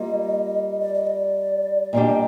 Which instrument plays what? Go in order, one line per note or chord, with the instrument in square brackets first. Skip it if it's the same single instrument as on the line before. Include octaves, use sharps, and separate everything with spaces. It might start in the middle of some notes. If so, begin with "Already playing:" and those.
Already playing: [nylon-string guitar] G3 A#3 F4 [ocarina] D#5
[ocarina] D5
D#5
D5
[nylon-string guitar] A#2 G3 D4 G4 [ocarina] D#5